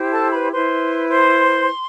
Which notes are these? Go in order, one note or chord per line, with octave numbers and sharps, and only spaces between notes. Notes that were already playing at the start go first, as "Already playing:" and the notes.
Already playing: E4 G4 C5
A4 A5
B4 B5
E4 B4 C5 C6
C5 C6